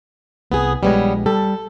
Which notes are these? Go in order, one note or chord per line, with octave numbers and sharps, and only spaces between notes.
C2 B3 G#4
A#1 G3 G#3 B3 C#5
G3 A4